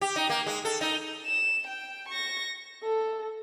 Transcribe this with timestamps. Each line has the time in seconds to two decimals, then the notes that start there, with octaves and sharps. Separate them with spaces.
0.01 G4
0.16 D#4
0.30 A#3
0.46 G#3
0.65 A4
0.81 D#4
1.26 E7
1.67 G5
2.09 C#6 A#6
2.83 A4